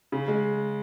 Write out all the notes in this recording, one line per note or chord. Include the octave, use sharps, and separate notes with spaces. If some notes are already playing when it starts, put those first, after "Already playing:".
C#3
G#3